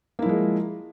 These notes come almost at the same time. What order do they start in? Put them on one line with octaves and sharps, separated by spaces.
A#3 E4 F3 G#3